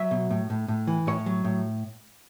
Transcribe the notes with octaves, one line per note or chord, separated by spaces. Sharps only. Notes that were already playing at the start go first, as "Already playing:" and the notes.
Already playing: F#3 E5
B2
A2
A2
A2
E3
A2 C#5
F#3
A2